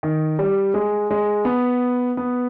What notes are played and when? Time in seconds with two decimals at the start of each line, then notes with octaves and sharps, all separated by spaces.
0.03 D#3
0.39 G3
0.74 G#3
1.11 G#3
1.45 B3
2.17 B3